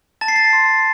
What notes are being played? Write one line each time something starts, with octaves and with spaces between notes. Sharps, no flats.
A5 A6
C7
A6
C6